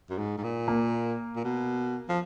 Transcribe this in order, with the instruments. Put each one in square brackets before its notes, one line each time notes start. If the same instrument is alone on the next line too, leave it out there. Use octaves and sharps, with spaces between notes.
[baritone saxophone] F#2
G#2
G#2
A#2
[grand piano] A#3
[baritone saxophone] A#2
B2
F3